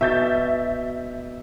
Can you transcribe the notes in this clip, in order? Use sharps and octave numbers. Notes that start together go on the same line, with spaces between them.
B2 E5 G6 A6